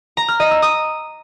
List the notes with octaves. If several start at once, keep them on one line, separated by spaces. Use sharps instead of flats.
A#5
F6
D#5
E6
D#6